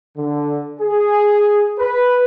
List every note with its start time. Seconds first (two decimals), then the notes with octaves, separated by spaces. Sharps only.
0.16 D3
0.80 G#4
1.79 B4